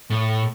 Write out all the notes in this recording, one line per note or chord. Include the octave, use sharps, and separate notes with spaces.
A2